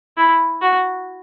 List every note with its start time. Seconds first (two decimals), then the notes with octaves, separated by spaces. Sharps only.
0.17 E4
0.62 F#4